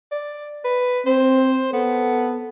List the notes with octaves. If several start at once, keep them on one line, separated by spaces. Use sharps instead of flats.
D5
B4
C4 C5
B3 A4